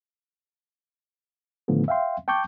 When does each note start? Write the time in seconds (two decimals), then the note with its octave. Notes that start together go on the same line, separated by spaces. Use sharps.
1.68 A2 D3 D#3 F3 A3 B3
1.88 E5 F5 G5 C6
2.28 G5 A5 C#6 D6 G6